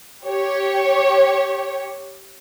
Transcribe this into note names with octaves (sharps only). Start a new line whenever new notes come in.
G4 C#5